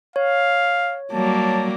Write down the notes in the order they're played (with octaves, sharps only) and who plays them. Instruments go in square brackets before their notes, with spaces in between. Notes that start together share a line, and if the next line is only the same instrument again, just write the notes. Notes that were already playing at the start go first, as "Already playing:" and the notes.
[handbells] C#5 [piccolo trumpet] F5
[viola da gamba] F#3 G3 A#3 [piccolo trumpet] A5